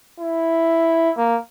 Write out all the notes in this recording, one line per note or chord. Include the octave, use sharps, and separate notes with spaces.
E4
A#3